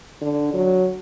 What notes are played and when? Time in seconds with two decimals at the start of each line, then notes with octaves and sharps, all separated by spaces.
0.21 D3
0.54 F#3